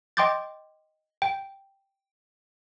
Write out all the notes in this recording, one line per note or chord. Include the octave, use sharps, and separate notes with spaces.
D#5 G5 C6 D6 G6 A6
G5